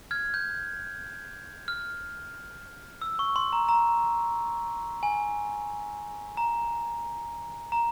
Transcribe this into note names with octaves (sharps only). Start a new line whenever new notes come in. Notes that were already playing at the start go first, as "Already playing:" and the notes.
F6 G#6
G6
F6
E6
C#6
C6
A#5
A#5
G#5
A#5
A#5